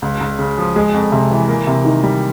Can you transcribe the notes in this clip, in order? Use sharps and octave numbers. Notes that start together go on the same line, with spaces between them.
C#2
C#2
C#3
F3
G#3
F2
C3
E3
A#3
C3
D#3
G3